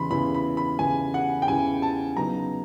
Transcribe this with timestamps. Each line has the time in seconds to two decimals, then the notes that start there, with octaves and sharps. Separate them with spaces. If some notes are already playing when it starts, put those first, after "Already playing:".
Already playing: E2 C#3 E3 B5 C6
0.11 E2 C#3 E3 B5
0.35 B5
0.57 B5
0.79 E2 C#3 E3 G#5
1.14 F#5
1.42 G5
1.47 E2 C#3 E3 G#5
1.82 A5
2.17 C#3 F#3 B3 D#4 A#5